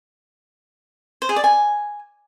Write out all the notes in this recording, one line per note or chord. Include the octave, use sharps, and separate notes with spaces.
C5
G#4
D5
G#5